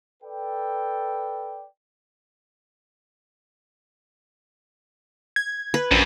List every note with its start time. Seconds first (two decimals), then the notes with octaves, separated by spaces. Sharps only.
0.22 A4 B4 D5 G5
5.36 G#6
5.74 B4
5.91 A#1 F#2